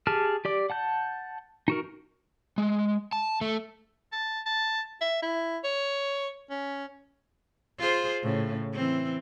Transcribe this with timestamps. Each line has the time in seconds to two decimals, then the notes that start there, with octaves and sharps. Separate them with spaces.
0.07 G4 G#4 A5 F6
0.45 G4 D5 D6
0.70 F#5 A5 G6
1.68 D#4 F#4 A#4
2.58 G#3
3.13 A5
3.41 A3
4.12 A5
4.46 A5
5.01 E5
5.22 E4
5.64 C#5
6.50 C#4
7.79 F4 G#4 C5
8.23 A2 C#3
8.73 E3 C4